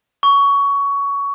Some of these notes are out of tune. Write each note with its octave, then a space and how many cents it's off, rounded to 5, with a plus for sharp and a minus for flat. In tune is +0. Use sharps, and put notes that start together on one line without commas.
C#6 +20